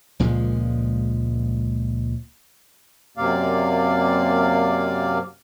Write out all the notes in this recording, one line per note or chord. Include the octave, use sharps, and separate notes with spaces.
C#2 A#2 F3 G#3
F#2 C3 A#3 D5 F5